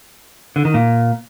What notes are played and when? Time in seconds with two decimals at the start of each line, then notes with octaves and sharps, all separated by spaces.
0.56 D3
0.65 D#3
0.74 A#2